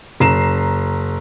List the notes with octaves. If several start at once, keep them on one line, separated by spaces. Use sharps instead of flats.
F#1 A#5 C7 E7